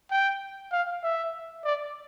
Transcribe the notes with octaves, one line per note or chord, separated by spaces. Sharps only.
G5
F5
E5
D5